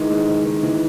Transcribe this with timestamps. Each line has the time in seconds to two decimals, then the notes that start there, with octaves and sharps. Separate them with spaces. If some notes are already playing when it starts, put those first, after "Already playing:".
Already playing: D#3 E3 G#3
0.10 G#3
0.28 D#3
0.45 D#3
0.63 E3